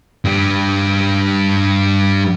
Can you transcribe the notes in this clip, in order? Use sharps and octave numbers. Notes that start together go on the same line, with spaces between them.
G2 G3